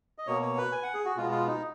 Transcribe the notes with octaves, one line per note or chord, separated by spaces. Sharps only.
D#5
B2 A#3 C#5
C#5
B4
G#5
F#5
G#4
F#4
B2 G#3 B3 F4
F4
D#4